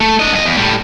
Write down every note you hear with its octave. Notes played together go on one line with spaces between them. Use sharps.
A3
D4 D#5
G2 D#5
E2
A2 G3